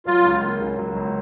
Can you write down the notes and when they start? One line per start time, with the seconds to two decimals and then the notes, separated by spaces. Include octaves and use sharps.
0.06 F#3 F4
0.25 C#2
0.42 A#3
0.61 C#3
0.79 F#3
0.96 C#2